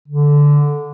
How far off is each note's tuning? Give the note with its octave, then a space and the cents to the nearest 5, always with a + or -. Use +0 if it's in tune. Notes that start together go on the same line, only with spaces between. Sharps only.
D3 -10